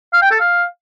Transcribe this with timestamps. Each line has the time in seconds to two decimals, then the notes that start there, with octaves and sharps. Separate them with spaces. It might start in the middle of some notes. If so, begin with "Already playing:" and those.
0.13 F5
0.22 G5
0.31 A4
0.40 F5